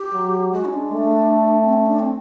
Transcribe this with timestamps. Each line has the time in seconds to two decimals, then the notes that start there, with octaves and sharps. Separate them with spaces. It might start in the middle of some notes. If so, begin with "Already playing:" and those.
Already playing: G4
0.13 F#3
0.53 G#3 F#4
0.65 C#4
0.73 D4
0.93 A3
1.64 C4
1.73 C#4
1.86 D4
1.99 C4